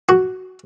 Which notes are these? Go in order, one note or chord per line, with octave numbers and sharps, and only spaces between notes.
F#4